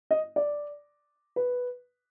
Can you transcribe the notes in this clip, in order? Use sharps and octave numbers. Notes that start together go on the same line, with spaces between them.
D#5
D5
B4